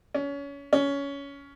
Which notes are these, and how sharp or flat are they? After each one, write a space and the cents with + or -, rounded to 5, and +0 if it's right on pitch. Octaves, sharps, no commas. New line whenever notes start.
C#4 +30
C#4 +20